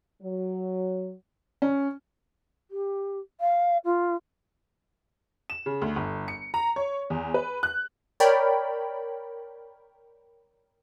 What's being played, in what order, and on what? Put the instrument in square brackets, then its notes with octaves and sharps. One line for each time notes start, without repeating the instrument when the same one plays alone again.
[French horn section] F#3
[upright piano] C#4
[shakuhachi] G4
F5
F4
[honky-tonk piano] E7
C#3
D2
G1
C#7
A#5
C#5
E2
B4
F#6
[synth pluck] A#4 C#5 D5 G5 B5